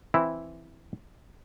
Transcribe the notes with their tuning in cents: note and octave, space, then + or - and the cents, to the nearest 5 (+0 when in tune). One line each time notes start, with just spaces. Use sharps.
E3 +0 C4 +0 E4 +0